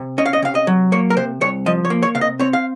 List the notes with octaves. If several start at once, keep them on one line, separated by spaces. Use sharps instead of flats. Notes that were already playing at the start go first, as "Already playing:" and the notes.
Already playing: C3
C#4 D#5
F5
D#5
C3 F5
D#5
F#3
A#3 C#5
A#4
C3 C5
C2 C#5
F3 D#5
C#5
A#3
C#5
C3 F5
D#5
C4 C#5
F5